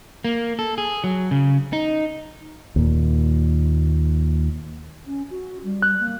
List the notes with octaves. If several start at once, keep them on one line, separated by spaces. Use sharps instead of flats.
A#3
A4
G#4
F#3
C#3
D#4
D#2 A#2
C#4
F#4
G3
F#6
A#3